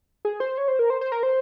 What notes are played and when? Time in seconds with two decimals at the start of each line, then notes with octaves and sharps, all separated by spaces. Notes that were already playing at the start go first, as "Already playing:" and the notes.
0.25 G#4
0.40 C5
0.58 C#5
0.68 C5
0.79 A#4
0.90 C5
1.01 C5
1.12 A#4
1.23 C5